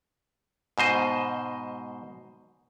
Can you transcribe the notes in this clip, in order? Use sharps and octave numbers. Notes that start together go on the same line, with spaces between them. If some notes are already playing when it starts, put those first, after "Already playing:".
G#2 B2 C5 D#5